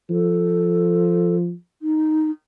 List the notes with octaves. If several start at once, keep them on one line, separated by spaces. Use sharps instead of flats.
F3 A4
D#4